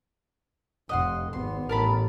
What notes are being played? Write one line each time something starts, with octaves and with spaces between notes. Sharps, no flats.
F1 F2 D#5 F#5 C6
G#1 B3 C6
A1 A#4 A5 B5